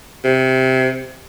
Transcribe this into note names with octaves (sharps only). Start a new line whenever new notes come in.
C3